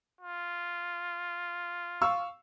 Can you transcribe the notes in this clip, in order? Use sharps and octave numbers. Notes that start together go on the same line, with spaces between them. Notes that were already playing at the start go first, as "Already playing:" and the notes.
F4
F5 C#6 E6